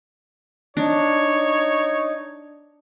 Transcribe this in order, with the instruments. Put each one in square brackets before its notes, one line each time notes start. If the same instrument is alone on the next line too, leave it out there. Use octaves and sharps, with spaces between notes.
[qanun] D4 [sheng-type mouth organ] D#4 [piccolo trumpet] C#5